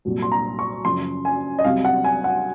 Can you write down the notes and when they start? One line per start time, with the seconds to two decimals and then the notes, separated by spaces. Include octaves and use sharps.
0.05 C2 A#2 F#3
0.22 C6
0.32 A#5
0.59 C#6
0.85 F#2 C#3 F3 C6
1.25 G#5
1.59 D#5
1.65 C2 C3 F#3 F5
1.85 F#5
2.04 G#5
2.24 F#5